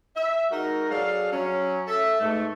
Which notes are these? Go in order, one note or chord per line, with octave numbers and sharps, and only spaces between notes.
E5
G#3 D#4 F#4 A#4
F#3 D4 G#4 A4 F5
F#3 C#4
A4 E5
G#2 B2 A3